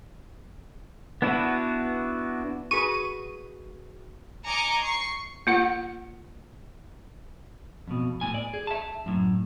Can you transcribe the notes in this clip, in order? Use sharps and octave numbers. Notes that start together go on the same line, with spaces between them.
B3 D4 E4 F#4 B4
F#4 G#4 B4 C#6 D#7
D#5 G#5 A#5 D6 C#7 D7
C#6 C7 C#7
A#3 F4 F#5
F2 B2
A2 G#5
D5
G#4
E5 A5
F#2 A2